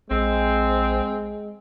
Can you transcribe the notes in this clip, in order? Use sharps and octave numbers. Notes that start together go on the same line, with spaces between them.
A#1 G#3 C4